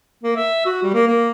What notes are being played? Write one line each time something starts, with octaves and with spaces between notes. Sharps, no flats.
A#3
E5
F#4
G3
A#3
A#3